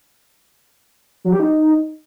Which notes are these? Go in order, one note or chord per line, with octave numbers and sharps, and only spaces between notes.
F#3
G4
D#4